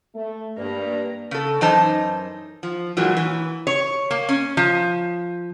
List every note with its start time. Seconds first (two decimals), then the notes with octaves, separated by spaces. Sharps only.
0.15 A3
0.57 G2 A#3 A#5
1.31 C#3 A4
1.61 F#2 E3 D#4 C5 D#5 A5
2.63 F3
2.97 A#2 E3 F#3 G#3
3.17 E3
3.67 C#5
4.11 A#3
4.29 C#4
4.57 F3